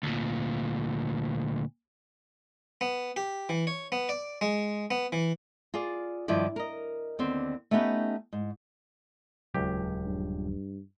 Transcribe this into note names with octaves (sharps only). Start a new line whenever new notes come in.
D2 A#2
B3
G4
E3
C#5
B3
D5
G#3
B3
E3
F4 G#4 D5
G2 D#3 F3 E4 D5
A#4 D#5
D#2 D3 B3 C4
A3 B3 C#4 D#4 G4 B4
G#2
D#1 C#2 F#3 G4
G2